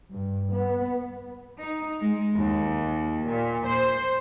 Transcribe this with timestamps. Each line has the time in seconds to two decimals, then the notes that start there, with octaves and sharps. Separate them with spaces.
0.11 G2
0.53 B3
1.59 D#4
2.01 G#3
2.35 D#2
3.27 A#2
3.67 C5